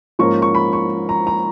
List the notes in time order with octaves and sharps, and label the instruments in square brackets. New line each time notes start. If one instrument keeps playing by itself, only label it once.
[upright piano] G#2 F3 A#3 C#4 C#6
C#6
B5
C#6
A#5
A#5